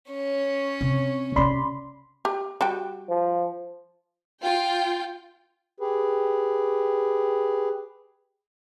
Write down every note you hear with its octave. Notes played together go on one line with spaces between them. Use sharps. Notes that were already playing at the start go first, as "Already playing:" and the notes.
C#4 C#5
C3
C3 C#4 D5 B5 C6
G4
G3 F#4 G5
F3
F4 G5
G4 G#4 B4